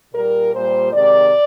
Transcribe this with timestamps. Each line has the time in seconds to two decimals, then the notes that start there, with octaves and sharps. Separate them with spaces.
0.13 A#2 G3 A#4
0.53 A#2 G3 C5
0.93 C3 D#3 G#3 D5